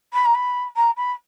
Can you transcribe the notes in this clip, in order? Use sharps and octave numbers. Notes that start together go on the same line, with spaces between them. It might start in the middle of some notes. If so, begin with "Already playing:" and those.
B5
A#5
B5
A#5
B5